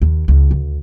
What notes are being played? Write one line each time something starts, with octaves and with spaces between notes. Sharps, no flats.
D#2
C#2
D2